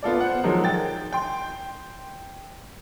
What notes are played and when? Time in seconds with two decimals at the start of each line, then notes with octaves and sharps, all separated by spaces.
0.03 B3 F4 A4 D5
0.20 C5 F#5
0.44 D#3 F3 F#3 G#3
0.64 G5 A6
1.13 G5 C6